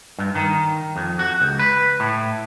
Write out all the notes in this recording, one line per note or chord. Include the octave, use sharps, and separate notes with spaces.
G2
D#3
F2
F#4
C#2
B4
A2